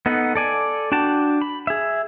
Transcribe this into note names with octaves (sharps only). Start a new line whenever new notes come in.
B3 D#4 A4 F#5
A4 D5 G#5
D4 F#4 G5 A5
B5
G#4 E5